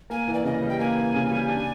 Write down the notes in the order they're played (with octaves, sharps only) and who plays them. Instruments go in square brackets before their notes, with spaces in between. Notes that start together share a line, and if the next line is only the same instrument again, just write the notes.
[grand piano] A#3 [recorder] G#5
[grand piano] E3
[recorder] D5
[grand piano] C#3 [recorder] D#5
[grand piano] G3
[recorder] G5
[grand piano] A#3 [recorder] G#5
[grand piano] E3
C#3
G3
D4